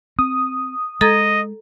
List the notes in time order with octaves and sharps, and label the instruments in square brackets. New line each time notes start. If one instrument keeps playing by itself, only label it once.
[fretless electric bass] C4 [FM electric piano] D#6
[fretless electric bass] G#3 [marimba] A4 A#5 G#6 [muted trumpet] D#5